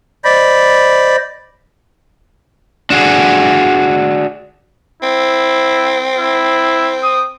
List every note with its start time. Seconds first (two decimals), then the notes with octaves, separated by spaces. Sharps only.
0.24 C5 D5 D#5 B5
2.90 D4 F#4 G#4
5.03 C4 E4
6.19 E4
7.03 D#6